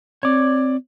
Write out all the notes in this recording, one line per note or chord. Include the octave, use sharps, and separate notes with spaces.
C4 C#5 D5